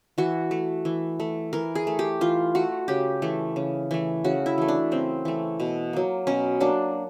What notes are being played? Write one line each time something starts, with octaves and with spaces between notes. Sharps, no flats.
E3 F#4
A3
E3
A3
E3 A#4
G#4
A3
G4
E3 F4
A3 F#4
C#3 G4
E3 A3
C#3
E3 A3
C#3 F#4
E4
E3 A3
D4
C#3 C4
E3 A3
B2
F#3 A#3
B2 C#4
F#3 A#3 D4